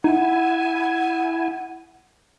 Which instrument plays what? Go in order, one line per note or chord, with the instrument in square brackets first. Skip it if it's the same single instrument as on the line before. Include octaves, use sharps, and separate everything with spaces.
[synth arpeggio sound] D#4 [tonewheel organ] E4 G#5 [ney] F#5